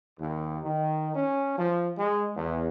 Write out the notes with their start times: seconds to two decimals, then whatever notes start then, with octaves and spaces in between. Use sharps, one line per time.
0.19 D#2
0.64 D#3
1.15 C#4
1.57 F3
1.97 G#3
2.36 E2